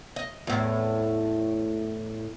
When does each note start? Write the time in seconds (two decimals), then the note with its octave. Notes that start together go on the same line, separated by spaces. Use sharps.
0.16 D#5
0.47 E2 A2